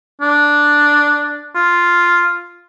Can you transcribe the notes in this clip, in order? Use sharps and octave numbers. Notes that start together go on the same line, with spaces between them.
D4
F4